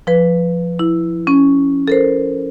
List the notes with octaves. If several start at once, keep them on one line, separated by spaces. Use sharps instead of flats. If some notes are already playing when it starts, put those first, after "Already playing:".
F3 B4
E4
C#4
A4 A#4 C5